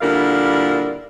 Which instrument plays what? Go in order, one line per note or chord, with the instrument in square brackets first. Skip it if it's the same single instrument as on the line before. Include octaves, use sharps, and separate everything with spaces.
[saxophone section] A#2 D3 G3 E4 A#4 F5